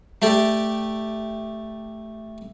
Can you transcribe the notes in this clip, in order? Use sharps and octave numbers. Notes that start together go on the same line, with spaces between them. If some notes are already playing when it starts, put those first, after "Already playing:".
A3 G4 D5